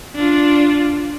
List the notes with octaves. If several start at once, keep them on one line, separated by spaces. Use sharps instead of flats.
D4 F4